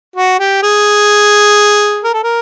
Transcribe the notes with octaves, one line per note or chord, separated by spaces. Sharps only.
F#4
G4
G#4
A#4
A4
A#4